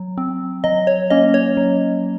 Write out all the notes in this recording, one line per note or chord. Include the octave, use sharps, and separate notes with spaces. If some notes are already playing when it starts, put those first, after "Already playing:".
Already playing: F#3
C4
F#3 D#5
C#5
A#3 C#4 D#5
C#5
F#3